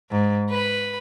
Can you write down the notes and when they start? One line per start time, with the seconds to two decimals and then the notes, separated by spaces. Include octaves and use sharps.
0.11 G#2
0.50 B4 B5